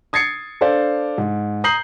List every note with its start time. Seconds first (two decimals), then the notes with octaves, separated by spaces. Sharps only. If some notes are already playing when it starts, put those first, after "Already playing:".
0.13 D#6 G#6 A6 C7 C#7
0.61 D4 A4 C5 D5 F5
1.18 G#2
1.64 A#5 D#6 G6 C7 F#7